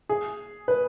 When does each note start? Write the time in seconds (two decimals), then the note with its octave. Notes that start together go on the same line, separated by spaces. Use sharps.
0.09 G#4
0.68 B4